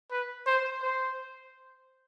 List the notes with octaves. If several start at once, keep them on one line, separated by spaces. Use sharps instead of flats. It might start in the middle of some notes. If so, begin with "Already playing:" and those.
B4
C5
C5